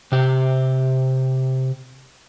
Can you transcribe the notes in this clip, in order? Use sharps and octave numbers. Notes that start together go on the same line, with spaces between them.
C3 G4